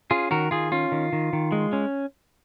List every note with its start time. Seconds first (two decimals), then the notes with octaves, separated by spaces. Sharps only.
0.11 C#4 F4 G#4
0.31 D#3 F#4 A#4
0.51 D#3 F4 G#4
0.72 C#4 F4
0.92 D#3
1.13 D#3
1.33 D#3
1.52 G#3
1.73 C#4